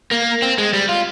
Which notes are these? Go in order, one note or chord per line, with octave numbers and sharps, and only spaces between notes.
A#3
C4
G#3
G3
F4